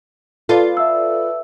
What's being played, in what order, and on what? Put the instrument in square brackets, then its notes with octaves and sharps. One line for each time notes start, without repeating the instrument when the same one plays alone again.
[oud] F4 [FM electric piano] A4 B4 D5
[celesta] E5 E6